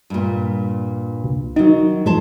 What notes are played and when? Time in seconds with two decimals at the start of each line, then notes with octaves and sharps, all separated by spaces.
0.10 G2 A#2
1.24 C2
1.56 D#3 F#3 D#4
2.06 G#2 F3 G#4 C5 A5